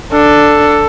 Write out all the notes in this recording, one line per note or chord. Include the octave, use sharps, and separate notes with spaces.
D4 A4